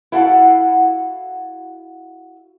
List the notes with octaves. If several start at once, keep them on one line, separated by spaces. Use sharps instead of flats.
E4 F#4 A4 F5 F#5